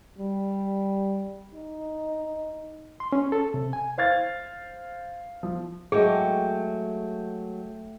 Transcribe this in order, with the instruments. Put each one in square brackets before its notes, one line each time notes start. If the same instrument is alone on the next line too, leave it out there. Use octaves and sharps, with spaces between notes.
[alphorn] G3
D#4
[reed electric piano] C6
C#4
A4
C3
G#5
[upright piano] C5 F5 G#6 A6
F3
[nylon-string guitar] F#3 G#3 [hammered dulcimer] A3 G5 [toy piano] G#4